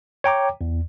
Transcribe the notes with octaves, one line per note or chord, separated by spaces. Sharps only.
C#5 G5 A#5 D6
E2